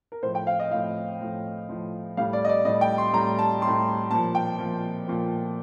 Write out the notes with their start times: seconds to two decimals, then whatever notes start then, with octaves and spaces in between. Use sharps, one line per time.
0.12 A#4
0.23 A2 F3 C5
0.35 G5
0.47 F5
0.60 D#5
0.71 A2 F3 F5
1.20 A2 F3
1.69 A2 F3
2.17 A2 G3 F5
2.33 D5
2.45 D#5
2.49 D5
2.65 A2 D#5
2.68 G3
2.81 G5
2.98 C6
3.13 A2 G3 A#5
3.38 A5
3.62 A2 G3 C6
4.11 A#2 F3 A5
4.35 G5
4.59 A#2 F3
5.07 A#2 F3